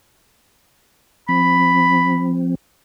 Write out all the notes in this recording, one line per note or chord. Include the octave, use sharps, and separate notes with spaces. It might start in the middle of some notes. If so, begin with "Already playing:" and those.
F3 C4 B5